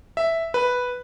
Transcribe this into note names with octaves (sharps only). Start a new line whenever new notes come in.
E5
B4